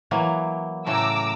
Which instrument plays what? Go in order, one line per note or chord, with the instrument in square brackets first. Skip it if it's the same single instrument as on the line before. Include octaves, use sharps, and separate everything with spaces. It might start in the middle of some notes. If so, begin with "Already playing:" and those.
[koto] E3 F#3 A#3
[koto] A2 C#3 A3 [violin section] A#5 D6 E6